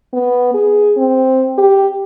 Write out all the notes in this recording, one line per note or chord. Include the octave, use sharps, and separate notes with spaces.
B3
G#4
C4
G4